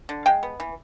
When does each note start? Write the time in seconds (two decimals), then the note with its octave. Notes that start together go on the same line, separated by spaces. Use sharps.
0.09 D3
0.26 G#3 F5 G5
0.43 B3
0.60 E3